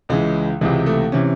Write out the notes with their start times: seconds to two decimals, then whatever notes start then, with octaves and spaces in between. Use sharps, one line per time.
0.09 C#2 C#3 E3 G#3
0.61 C#2 C3 E3 G#3
0.86 A3
1.12 C3 E3 C#4